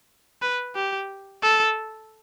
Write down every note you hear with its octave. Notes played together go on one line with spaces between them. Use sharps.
B4
G4
A4